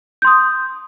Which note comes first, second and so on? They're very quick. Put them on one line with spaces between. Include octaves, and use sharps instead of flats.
G6 C6 D#6